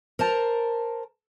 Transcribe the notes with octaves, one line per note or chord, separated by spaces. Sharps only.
A#4 C5 A5 A#5